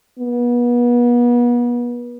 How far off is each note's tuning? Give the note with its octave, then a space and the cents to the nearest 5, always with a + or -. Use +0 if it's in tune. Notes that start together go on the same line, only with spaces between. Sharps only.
B3 -35